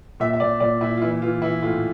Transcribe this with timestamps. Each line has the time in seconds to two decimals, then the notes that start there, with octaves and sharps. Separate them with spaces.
0.20 A#2 E5
0.33 E5
0.40 A#2 D5
0.60 A#2 D5
0.81 A#2 E4
0.97 F4
1.02 E3 E4
1.22 E3 F4
1.42 E3 E4
1.62 A2 F4